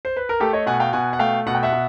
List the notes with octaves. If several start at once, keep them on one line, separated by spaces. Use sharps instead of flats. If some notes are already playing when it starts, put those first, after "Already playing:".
C5
B4
A#4
A3 G4 A4
C#5 D#5
B2 F#5 G#5
F5 G5
B2 F#5 G#5
F#5
A3 F5 G5
B2 F#5
G5
E5 F#5
B2